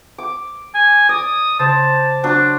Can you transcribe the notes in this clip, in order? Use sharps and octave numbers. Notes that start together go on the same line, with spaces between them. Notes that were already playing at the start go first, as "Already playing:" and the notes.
D6
G#5
D5 D#6
C#3 C5 A5
F#3 D4 A5